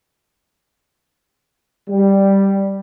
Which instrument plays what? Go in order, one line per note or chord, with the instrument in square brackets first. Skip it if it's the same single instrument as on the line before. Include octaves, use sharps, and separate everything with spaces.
[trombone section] G3